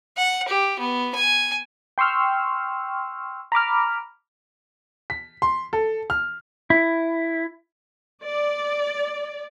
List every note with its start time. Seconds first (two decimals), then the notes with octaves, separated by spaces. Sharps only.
0.17 F#5
0.48 G4
0.79 B3
1.15 G#5
1.98 G5 C6 C#6 E6 F6
3.52 A#5 B5 D6 F6
5.10 B6
5.42 C6
5.73 A4
6.10 F6
6.70 E4
8.23 D5